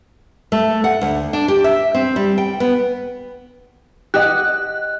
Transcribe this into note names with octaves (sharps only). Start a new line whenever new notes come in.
A3
F#5
D2
D4
G4
E5
C4
G3
G5
B3
G4 D#5 F#5 F#6